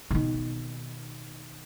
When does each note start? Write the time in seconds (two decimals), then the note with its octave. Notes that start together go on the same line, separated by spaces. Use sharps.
0.11 B2 D#3